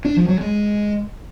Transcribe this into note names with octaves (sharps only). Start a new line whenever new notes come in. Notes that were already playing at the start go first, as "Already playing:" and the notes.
D4
F3
F#3
G#3